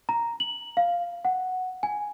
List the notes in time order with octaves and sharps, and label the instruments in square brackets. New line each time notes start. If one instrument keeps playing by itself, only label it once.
[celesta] A#5
F#7
F5
F#5
G#5